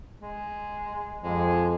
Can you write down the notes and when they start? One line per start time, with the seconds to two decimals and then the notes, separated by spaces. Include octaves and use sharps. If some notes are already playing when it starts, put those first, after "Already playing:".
0.21 G#3
1.23 F2 G#3